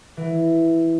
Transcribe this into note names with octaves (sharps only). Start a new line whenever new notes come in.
E3